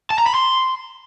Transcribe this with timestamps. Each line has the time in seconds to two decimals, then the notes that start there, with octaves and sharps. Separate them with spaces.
0.10 A5
0.18 A#5
0.26 B5
0.34 C6